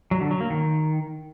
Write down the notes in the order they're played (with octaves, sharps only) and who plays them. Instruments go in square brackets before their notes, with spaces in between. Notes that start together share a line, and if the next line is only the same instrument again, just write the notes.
[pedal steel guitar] F#3
D3
F#3
A#3
D#3